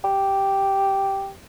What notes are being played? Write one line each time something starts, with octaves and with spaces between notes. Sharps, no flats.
G4